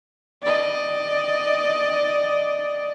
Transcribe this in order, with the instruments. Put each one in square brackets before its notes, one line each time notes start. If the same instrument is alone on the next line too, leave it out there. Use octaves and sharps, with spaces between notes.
[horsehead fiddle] D5 D#5